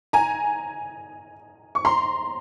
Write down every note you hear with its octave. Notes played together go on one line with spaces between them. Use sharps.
G#5 A#5
C#6
A#5 C6